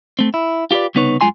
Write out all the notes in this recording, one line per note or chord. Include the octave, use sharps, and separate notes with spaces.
A3 C4
E4
F4 G4 G#4 B4 D5
C2 C#3 B3 D#4 B4 C#5
F#2 C#3 G#3 F4 G#5 C6